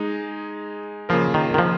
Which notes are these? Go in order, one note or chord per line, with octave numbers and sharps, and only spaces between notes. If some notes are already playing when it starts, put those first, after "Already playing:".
Already playing: G#3 D#4 G#4
C#3 F3 A#3 F4 A#4
D#3
D#3
F3